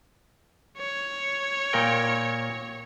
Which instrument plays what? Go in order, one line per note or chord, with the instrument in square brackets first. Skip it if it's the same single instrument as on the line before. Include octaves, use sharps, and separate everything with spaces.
[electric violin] C#5
[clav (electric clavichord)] A#2 A#4 G5